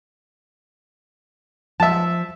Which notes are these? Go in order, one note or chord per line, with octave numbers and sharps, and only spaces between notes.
F3 E5 A5